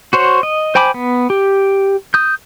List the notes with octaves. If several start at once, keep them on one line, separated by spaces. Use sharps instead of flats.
F#4 C5 C#5
D#5
C5 G5 G#5 B5 D6
B3
G4
D#6 G6